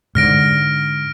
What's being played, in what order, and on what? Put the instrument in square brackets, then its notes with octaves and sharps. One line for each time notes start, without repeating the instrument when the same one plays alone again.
[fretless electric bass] G#2 D3 [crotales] F6 A#6 D7